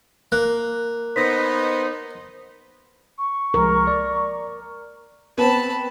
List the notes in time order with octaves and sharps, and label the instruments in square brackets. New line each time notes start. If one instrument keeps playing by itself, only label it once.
[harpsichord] A#3 [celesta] F#6
[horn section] B3 D#4 [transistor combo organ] C5 [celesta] C6 A#6 B6
[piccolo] C#6
[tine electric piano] C2 F3 G#3 [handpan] A#4
[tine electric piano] D5
[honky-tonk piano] B3 C4 [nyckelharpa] A5 B5